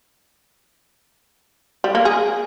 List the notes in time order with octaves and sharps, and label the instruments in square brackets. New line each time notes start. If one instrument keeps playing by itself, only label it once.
[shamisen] G3
A#3
G#4